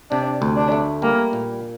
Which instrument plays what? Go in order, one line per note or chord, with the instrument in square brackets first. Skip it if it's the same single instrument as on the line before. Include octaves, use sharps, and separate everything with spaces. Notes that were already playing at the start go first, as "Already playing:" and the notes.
[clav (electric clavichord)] C3 [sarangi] D4
[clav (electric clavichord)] D2
[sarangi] D4
[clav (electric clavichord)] A3
[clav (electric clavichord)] G3 [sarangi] A#3
[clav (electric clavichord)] A#2